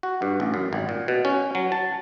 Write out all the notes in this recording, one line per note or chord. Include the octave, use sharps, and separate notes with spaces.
F#4
G2
A1
F#2
G#1
A#2
B2
C#4
F#3
A5